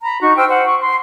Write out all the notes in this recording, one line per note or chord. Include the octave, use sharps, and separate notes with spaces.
A#5 B5
D#4 F#4 C#6
C5 G5 E6 F6
C5 F#5
C#6
C6